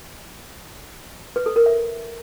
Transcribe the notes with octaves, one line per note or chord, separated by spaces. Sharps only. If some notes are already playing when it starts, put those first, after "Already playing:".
B4
A4
A#4
E5